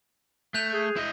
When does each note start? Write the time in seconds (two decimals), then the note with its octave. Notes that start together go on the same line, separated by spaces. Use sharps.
0.54 A3 F#6 G6 F7
0.73 G#4
0.96 E4 D#5 G6